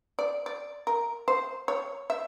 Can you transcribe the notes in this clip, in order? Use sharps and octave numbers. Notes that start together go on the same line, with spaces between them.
D5
D5
A#4
C5
C#5
E5